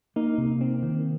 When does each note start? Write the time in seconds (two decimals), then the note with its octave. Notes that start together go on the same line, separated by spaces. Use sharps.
0.16 A#3 D#4
0.38 C3
0.61 C4
0.83 D#3